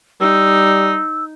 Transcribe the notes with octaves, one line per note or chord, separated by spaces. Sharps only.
G3 D#4 E6